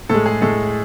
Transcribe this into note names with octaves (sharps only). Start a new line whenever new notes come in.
A2 G#3 A4
G#4
A2 G#3 A4